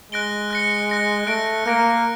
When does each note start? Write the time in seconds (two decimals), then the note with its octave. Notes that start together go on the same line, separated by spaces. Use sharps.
0.12 G#3 F#6 A#6 D7 G7
0.50 F#6 A#6 C#7
0.89 F#6 A#6 C#7
1.27 A3 F#6 A#6 D7
1.66 A#3 F#6 A#6 D7